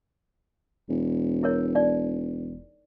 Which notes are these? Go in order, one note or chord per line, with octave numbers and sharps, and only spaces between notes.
E1
E4 A#4 C#5
D#4 D5